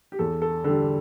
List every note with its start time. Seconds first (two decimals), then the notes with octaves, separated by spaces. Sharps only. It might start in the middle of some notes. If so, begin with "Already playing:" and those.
0.12 G4
0.19 E2 A4
0.42 A4
0.64 D3 G3 A4